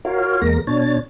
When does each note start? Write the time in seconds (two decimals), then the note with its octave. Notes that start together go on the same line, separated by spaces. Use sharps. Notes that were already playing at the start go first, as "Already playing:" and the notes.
0.05 F4 F#4 A#4 C#5 F5
0.42 E2 G#3 A#3 A#4 A#6
0.67 B2 D4 C#5 A6